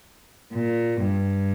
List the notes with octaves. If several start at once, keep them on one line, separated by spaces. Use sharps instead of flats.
A#2
G2